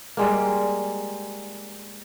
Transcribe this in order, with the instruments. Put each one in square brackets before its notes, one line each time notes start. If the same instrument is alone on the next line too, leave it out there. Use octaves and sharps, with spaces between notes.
[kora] G3 G#3 A#3